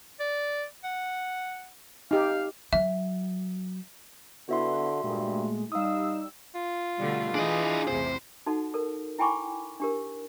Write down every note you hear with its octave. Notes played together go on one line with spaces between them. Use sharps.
D5
F#5
D#4 G4 F5
F#3 E5
D3 B3 E4 F#4 E5 C6
G2 A#2 G#3 A3
G3 D#4 F5 D#6 E6
F4
B2 D3 G3 A3
E3 D4 G#4 D#5
A1 E2 C3 C5
D#4 F#4 A4 F#5 A5
A4 A#4
E4 G5 G#5 B5 C#6 D6
D4 G4 A#4